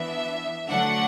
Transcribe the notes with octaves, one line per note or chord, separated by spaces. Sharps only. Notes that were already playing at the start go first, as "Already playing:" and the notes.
Already playing: E3 B3 D4 E5
D3 F#3 A3 D4 F#5